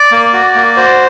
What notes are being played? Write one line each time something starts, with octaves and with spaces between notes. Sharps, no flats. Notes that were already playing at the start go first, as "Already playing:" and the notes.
Already playing: D5
A#3
F#4
A#3
F#4 C5